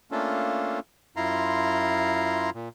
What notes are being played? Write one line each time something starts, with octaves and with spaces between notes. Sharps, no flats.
A3 A#3 C#4 D4 F4 A4
F#2 E4 F4 A#5 C6
A#2